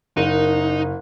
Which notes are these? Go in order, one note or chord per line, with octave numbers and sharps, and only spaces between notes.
F#1 D#4 A#4 F#5